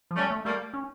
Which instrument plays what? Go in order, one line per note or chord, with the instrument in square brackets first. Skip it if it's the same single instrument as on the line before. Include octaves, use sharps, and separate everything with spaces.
[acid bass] F3
[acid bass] G3 [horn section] A3 C#4
[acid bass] A3
[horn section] G3 A#3 [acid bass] A3
[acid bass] C#4